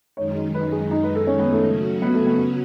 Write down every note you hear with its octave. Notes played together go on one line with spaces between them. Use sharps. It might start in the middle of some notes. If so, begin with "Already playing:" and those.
F#2 D#3 G#3 D#4 C#5
B4
G#4
D#4
B4
A4
C#4
B3
A3
C#3 F#3 C#4 F#4
B3
A3
B3